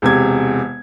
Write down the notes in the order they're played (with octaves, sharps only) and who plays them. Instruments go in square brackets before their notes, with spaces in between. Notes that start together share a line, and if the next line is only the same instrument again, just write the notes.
[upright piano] E1 C3 G#6